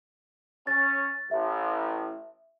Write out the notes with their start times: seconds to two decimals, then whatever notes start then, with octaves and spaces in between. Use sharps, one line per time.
0.67 C#4 A6
1.31 A1 E5